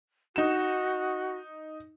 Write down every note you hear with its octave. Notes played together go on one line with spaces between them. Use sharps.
D#4 F#4 E7